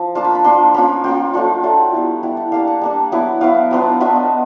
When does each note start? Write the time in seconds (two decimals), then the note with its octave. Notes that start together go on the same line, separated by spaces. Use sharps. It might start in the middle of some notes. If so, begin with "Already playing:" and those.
Already playing: F3
0.15 A#3 D4 F4 A5
0.25 B5
0.35 B5
0.44 A#3 D4 F4 C6
0.74 A#3 C#4 F4 B5
1.04 A#3 C#4 F4 G5
1.34 F#3 A3 D4 F4
1.63 F#3 A3 D4 F4
1.93 G3 B3 E4
2.23 G3 B3 E4
2.37 F#5
2.52 G3 A#3 D4 F5
2.67 F#5
2.81 G3 A#3 D4
3.12 F#3 B3 E4
3.41 F#3 B3 E4 F5
3.71 F#3 B3 D4 F4
4.00 F#3 B3 D4 F4 E5
4.16 D#5